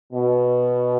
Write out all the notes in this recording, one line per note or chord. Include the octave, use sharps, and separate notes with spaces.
B2